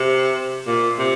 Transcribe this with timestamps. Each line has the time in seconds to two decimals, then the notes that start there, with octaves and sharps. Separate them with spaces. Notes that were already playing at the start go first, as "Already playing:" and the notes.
Already playing: C3
0.67 A#2
0.98 C3